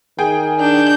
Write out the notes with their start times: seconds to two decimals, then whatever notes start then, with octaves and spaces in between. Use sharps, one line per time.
0.19 D#3 G#4 G5
0.59 D4 G6